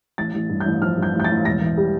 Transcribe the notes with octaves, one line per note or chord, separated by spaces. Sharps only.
A1 A6
A1
G2
G6
A1
F3 F6
G2 G6
A1
G6
A6
A1
E1 A#6
E3
G3